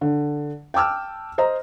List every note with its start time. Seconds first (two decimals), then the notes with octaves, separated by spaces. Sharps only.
0.01 D3
0.74 G5 A5 D6 E6 F6
1.38 C5 D#5 A#5